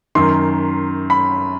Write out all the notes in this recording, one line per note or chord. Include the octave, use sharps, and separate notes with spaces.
F#2 D#3 C6
B5